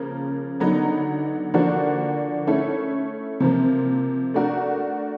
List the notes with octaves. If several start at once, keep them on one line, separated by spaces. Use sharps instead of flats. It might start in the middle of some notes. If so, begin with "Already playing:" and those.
Already playing: C#3 F3 A#3
D3 F#3 B3 D#4
D3 F3 A#3 D4 F#4
A3 C#4 E4 A4
C3 F3 A#3
A3 D4 F#4 A#4